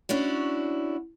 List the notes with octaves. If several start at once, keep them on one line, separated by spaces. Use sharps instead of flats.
C#4 D4 E4 F#4